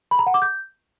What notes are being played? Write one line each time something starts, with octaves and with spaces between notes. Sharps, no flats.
B5
A#5
F#5
D6
G6